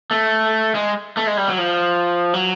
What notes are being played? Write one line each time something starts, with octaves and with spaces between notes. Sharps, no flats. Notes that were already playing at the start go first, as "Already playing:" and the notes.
A3
G#3
A3
G#3
G3
F#3
F3
F#3